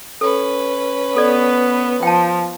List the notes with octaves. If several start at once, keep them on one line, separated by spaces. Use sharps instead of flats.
C#4 A4 B4
B3 A4 D5
F3 G5 A5